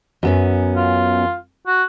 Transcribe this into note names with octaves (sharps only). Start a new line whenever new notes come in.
F#2 B3 C#4
F4
F#4